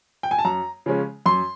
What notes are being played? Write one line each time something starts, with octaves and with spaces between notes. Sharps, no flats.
G5
G#5
A5
F#2 A#5
C#3 F3 G#3 C#4
F#2 C6